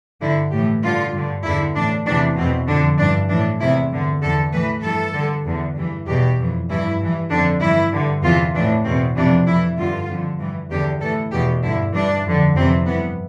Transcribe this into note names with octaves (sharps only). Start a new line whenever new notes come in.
G2 D3 E4
A2 E3 G4
G2 D3 F4
G2 D3
E2 D3 E4
A2 E3 D4
E2 C3 E3 D4
E2 B2 C4
F2 D3 D4
G2 E3 D4
A2 E3 D4
E2 C3 E3 E4
G2 D3
E2 D3 A4
A2 E3 B4
G2 E3 A4
G2 D3
E2 D3
G2 E3
E2 B2 G4
F2 E3
G2 E3 E4
G2 E3
F2 D3 D4
G2 E3 E4
G2 D3
E2 C3 E3 F4
A2 E3 D4
E2 B2 C4
F2 C3 E3 D4
F2 E3 E4
G2 D3 F4
F2 D3
G2 E3
E2 D3 G4
A2 E3 A4
E2 B2 G4
G2 D3 E4
G2 E3 D4
F2 D3
F2 C3 E3 C4
G2 E3 B3